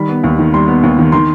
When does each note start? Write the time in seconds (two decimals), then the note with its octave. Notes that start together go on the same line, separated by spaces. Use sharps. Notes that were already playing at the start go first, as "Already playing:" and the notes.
Already playing: D#3 G3 B5
0.09 B3
0.24 D#2
0.39 D#3
0.54 G3 C6
0.68 B3
0.83 D#2
0.99 D#3
1.12 D#3 C6